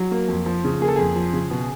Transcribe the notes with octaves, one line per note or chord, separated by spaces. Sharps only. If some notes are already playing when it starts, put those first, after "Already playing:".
Already playing: F#3
A#3
F2
F3
C#3
A#3 G#4
A4
F2 G#4
F3
C#3
B2